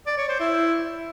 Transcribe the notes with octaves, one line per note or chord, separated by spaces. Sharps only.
D5
C#5
C5
E4